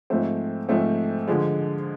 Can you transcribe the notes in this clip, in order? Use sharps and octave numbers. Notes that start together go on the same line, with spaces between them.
G#2 F3 A3 C4
G#2 F3 A3 C4
D3 F3 G#3